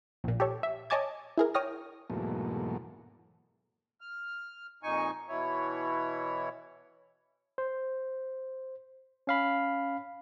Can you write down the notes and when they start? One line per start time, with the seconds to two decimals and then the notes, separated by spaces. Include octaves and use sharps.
0.24 A#1 A#2
0.40 G4 A4 C#5
0.63 E5
0.90 C#5 D#5 G#5 A5 D6 G#6
1.38 E4 G#4 A#4
1.54 C#5 G5 D#6 F6 A#6
2.10 E2 G#2 B2 F#3 A3 A#3
4.01 F6
4.83 F2 A#2 D#4 G#5 C#6
5.29 B2 E3 E4 C#5
7.58 C5
9.27 C#4 F5 B5